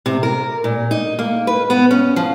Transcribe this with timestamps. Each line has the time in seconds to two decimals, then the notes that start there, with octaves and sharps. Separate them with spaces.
0.06 C3
0.23 A#4
0.64 A#2
0.91 D#4
1.19 A#3
1.47 B4
1.70 B3
1.91 C#4
2.16 F3